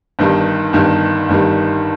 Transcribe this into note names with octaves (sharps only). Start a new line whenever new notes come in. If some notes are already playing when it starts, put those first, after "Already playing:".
G1 G2 D#3 G3
G1 G2 D#3 G3
G1 G2 D#3 G3